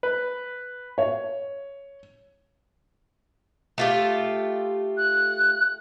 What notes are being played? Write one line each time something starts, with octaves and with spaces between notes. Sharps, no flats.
B4
C#5
A3 F4 G4
F#6